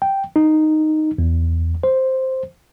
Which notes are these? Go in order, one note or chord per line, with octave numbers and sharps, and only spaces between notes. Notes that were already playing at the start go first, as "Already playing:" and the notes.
G5
D#4
E2
C5